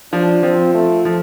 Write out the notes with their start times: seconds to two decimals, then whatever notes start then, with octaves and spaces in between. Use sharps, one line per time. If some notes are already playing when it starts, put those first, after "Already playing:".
0.13 F3 D4
0.43 F3 C4
0.74 A3
1.05 F3